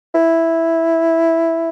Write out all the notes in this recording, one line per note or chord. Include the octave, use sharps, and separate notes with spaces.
E4